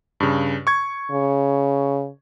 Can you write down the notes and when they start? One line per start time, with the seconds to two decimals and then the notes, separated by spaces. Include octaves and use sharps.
0.20 G2 C#3
0.67 C#6 G#6
1.11 C#3